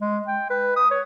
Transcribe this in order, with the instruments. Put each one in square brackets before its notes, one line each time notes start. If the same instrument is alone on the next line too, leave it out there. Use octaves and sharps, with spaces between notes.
[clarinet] G#3
G5
B4
D#6
C#5